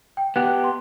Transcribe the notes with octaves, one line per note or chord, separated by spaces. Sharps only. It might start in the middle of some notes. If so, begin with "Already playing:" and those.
G5
B3 G4 F#6
C6